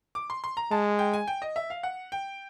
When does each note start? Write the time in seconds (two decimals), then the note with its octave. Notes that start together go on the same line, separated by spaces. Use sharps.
0.15 D6
0.30 C6
0.44 C6
0.57 A#5
0.71 G#3 A5
0.99 G5
1.14 G#5
1.27 G5
1.42 D#5
1.56 E5
1.70 F5
1.83 F#5
2.12 G5